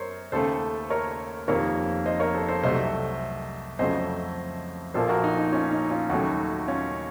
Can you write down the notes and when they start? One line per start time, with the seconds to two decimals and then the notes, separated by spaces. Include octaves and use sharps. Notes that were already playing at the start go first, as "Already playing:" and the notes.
Already playing: F#2 A#4 C5 C#5
0.32 D#2 C#3 A3 A4 C5
0.90 A#4 C#5
1.48 F1 F2 D#3 A#3 A#4 C#5
2.06 C5 D#5
2.20 A#4 C#5
2.34 A4 C5
2.49 A4 C5
2.63 C2 C3 F#3 A3 C5 D#5
3.79 F2 C#3 F#3 A3 C5 D#5
4.94 A#1 A#2 F3 A#3 A4 C5
5.09 F#4 A#4
5.24 D#4
5.37 D#4
5.52 C#4 F4
5.71 D#4
5.91 C#4 F4
6.10 D#2 C#3 F#3 A3 D#4 F#4
6.67 C#4 F4